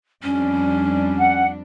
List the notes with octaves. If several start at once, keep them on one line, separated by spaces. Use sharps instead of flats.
F2 G3 C#4 D4
F#5